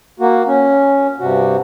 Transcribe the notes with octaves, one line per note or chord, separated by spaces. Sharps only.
A#3 F#4
C#4
G2 C3 F#4